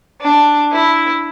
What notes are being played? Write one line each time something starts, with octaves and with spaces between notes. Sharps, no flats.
D4
E4